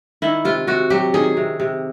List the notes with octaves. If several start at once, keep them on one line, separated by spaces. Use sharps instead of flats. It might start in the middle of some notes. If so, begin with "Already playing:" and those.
D#3 E4
C3 F4
C3 F#4
F#3 G4
D#3 G#4
C3
C3